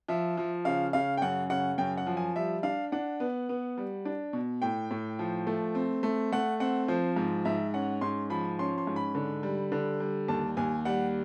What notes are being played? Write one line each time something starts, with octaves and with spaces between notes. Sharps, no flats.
F3 E5
F3
C#3 F5
C#3 F5
G5
F#2 F#5
C#3 F#5
F#2 G5
F#5
F3
G#5
G3 E5
D4 F5
D4 F#5
B3
B3
G3
D4
B2
A2 G5
A2
F3
A3
C4
A3
A3 F#5
C4 F#5
F3 C5
G#2
G#2 E5
C#4 F#5
G#2 C6
F3 B5
C#4 C6
C6
G#2
B5
D3
G3
D3
G3
D#2 A5
D#2 G#5
G3 F#5